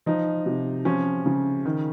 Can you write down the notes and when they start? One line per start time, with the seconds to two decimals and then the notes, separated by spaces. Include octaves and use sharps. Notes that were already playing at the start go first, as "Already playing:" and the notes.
0.06 F3 D#4
0.46 C3
0.85 F3 C#4
1.26 C#3
1.66 D#3